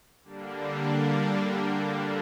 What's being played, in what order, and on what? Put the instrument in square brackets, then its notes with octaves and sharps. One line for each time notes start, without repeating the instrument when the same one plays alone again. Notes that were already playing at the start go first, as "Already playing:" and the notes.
[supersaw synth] D3 G3 A#3 D4